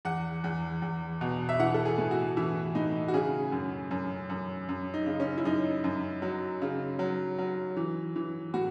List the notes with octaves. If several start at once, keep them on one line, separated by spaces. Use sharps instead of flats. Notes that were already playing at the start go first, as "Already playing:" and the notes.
E2 F#5
E2
E2
B2
E5
E3 F#5
A4
G#4
A2
F#4
E3 E4
A2 D#4
F#4
C#3 G#4
F#2
F#2
F#2
F#2
D#4
C#3
C#4
E4
F#2 D#4
F#2
F#3
C#3
F#3
F#3
E3
E3
A2 F#4